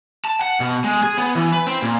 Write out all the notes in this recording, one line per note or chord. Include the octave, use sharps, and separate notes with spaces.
A5
F#5
B2
G#3
G#4
B3
E3
B4
C4
A#2